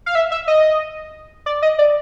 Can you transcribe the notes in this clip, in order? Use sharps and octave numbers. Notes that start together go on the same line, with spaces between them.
F5
E5
E5
D#5
D5
D#5
D5